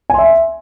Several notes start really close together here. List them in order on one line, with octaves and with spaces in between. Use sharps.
G#5 C6 E5